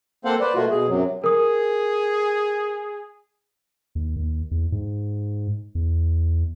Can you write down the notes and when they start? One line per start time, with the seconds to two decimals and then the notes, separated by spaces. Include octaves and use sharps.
0.25 A#3 C4 A4 C5 F5 F#5
0.40 B4 C5 D5
0.56 B2 A3 A#3 F4 F#4
0.70 B2 G#4
0.88 F#2 C3 F#3
1.24 G#4 A#4 D#6
3.95 D#2
4.16 D#2
4.51 E2
4.72 G#2
5.75 E2